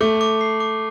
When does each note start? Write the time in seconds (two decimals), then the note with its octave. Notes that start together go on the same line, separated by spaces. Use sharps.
0.01 A3 D6
0.21 D6
0.41 C7
0.60 D6